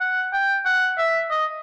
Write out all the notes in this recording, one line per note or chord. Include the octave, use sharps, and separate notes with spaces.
F#5
G5
F#5
E5
D#5